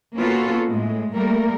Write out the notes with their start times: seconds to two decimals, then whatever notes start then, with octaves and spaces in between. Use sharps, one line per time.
0.17 A#3 B3 C#4 F4 F#4 A4
0.68 A2 G#3
1.14 G3 A3 A#3 A#4